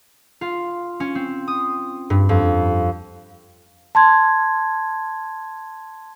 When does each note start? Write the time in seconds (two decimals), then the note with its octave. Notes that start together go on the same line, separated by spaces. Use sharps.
0.41 F4
1.00 C#4
1.15 C4
1.48 D#6
2.10 G2
2.29 F2
3.95 A5 C6 G#6